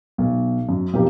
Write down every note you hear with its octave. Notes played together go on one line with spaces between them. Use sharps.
B1
F#2
B1 F2 A#3 G4